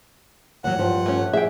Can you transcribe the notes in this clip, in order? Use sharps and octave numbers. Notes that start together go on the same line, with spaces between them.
D#2 F#3 F#5
G2 F3
A3 C#4
G#4 E5 G5